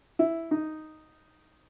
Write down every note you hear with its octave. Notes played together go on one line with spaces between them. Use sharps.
E4
D#4